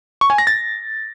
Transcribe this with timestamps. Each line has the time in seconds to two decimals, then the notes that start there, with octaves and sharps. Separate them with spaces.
0.21 C#6
0.30 G#5
0.38 A#6
0.47 A6